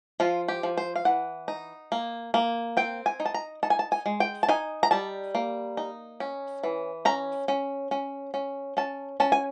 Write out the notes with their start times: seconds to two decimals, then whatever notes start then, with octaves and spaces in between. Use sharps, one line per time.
0.20 F3 F4
0.48 G4
0.63 F3
0.77 C5
0.96 F5
1.05 E3 F#5
1.48 D#4
1.92 A#3
2.34 A#3
2.77 C4 G5
3.06 G#5
3.20 D#4
3.25 A5
3.34 A#5
3.63 D#4 A5
3.70 G#5
3.79 A5
3.92 G#5
4.06 G#3
4.20 G5
4.43 A5
4.48 D#4 G#5
4.83 A#5
4.91 G3 A5
5.35 A#3
5.77 D#4
6.20 C#4
6.63 E3
7.05 C#4 A#5
7.48 C#4
7.91 C#4
8.34 C#4
8.77 C#4 A5
9.20 C#4 A5
9.32 G#5